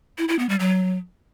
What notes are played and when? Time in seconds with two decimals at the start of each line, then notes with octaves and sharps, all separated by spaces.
0.18 E4
0.28 E4
0.39 B3
0.49 G3
0.60 F#3